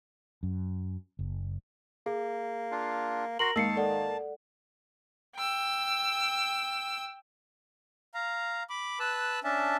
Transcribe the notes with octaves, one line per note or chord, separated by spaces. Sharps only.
F#2
F#1
A#3 G#4
D4 F4
F#4 A#4 C6 A#6 F#7
G#2 D#3 A#3 A5 E6 C7 C#7
A4 D5 F#5
G5 E6
F5 A#5
B5 D6
B4 A5 E6 F#6
C#4 D4 E5 A5